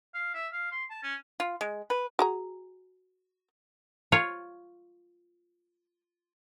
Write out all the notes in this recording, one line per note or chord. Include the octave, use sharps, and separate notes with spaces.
F5
E5
F5
C6
A5
C#4
F4
G#3
B4
F#4 G#4 A#5
F4 C#5